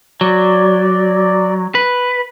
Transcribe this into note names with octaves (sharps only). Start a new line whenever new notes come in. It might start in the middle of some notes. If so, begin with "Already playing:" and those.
F#3 D5
B4